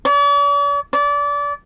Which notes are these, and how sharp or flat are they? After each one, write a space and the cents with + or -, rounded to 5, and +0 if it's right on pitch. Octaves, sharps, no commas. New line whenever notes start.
D5 -45
D5 -25